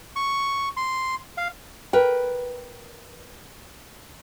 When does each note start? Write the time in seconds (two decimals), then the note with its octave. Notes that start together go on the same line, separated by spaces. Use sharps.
0.16 C#6
0.77 C6
1.37 F5
1.93 A#4 B4 G5